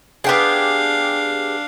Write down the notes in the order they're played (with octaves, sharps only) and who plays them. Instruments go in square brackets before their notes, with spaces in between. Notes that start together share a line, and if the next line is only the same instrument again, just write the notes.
[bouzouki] B3 G4 G#4 [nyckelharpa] D4 F5